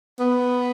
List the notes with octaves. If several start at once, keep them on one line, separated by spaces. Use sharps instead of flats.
B3